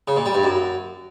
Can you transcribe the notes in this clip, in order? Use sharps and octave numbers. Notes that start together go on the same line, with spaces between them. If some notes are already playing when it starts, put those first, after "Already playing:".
C#3
A#2
G3
G2
F#2